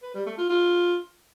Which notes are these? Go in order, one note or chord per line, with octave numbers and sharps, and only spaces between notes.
B4
G3
A3
F4
F4